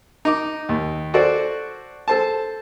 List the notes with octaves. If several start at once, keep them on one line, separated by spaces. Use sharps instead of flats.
D#4 D6
D#2
F#4 A4 C5 D5
A4 C5 A5